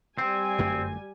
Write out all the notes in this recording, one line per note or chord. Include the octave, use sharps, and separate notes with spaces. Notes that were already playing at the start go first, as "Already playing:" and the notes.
G3 C4 G#5
G1 F#2 A3